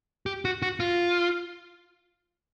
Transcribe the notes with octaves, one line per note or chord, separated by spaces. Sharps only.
G4
F#4
F#4
F4